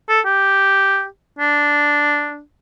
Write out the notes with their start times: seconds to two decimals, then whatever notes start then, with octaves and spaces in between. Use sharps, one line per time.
0.09 A4
0.26 G4
1.39 D4